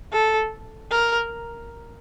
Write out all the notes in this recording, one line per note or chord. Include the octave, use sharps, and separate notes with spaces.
A4
A#4